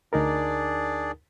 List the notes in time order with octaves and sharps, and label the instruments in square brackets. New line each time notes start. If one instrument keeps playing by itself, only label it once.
[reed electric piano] D2 D#4 A#4 [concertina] D4 G#4 D5